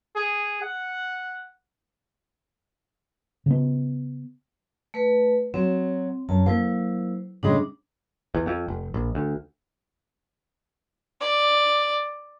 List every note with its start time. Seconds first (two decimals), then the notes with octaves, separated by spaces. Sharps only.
0.16 G#4
0.62 F#5
3.46 C#3 B3
4.94 A3 B4
5.54 F#3 C4
6.29 F#2 A5
6.46 F#3 A#3 E4 C5
7.43 A2 C#3 G#3 D4
8.35 E2
8.47 F2
8.68 F1
8.94 A#1
9.15 D2
11.21 D5